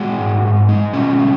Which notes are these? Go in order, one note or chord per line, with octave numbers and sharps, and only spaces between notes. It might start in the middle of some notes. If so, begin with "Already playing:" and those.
Already playing: G#3 F#4
G#2
G#2
G#3
B2 C#4
G#3